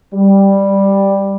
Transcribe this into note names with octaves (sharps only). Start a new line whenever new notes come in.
G3